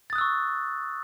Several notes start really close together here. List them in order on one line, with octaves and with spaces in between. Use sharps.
A6 D#6 F#6 E6 C#6